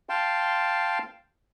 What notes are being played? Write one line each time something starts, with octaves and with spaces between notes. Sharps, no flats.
F5 G5 A5 C6